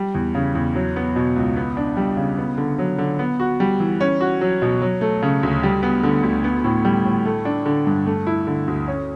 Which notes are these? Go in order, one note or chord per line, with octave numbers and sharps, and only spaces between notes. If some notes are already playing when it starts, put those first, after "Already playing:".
Already playing: G3
E2
C#3
E2
F#3
B3
B2
C#2
B3
D4
G3
C#3
B3
D3
F#3
D3
B3
F#4
G3
E3
C#4
F#4
F#3
B2
F#3
A3
C#3
D2
G3
B3
D3
D2
B3
A2
G3
A2
A3
D4
D3
G2
A3
E4
D3
D2
C#4